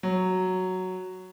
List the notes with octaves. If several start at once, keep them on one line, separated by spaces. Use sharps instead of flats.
F#3